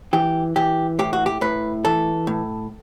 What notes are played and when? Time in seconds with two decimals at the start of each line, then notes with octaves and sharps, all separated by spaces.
0.13 E3 G4
0.56 E3 G4
0.99 A2 G4
1.13 F#4
1.26 G4
1.41 A2 B4
1.85 E3 A4
2.27 A2